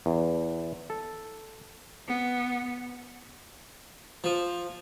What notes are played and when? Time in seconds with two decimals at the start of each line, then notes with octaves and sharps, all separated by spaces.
0.06 E2
0.90 A4
2.07 B3
4.24 F3